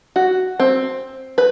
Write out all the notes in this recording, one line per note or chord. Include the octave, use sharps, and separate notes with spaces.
F#4
C4
B4